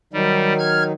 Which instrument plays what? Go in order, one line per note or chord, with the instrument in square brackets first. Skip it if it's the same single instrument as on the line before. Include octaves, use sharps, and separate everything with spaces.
[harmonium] D#3 F#3 D#4 [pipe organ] G3
[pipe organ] F6 G#6